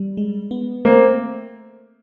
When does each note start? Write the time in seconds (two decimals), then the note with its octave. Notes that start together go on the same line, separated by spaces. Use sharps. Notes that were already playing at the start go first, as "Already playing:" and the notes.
Already playing: G3
0.17 G#3
0.51 B3
0.85 A3 A#3 C4